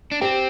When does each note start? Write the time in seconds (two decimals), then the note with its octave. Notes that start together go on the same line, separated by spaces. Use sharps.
0.12 D4
0.21 C4 G4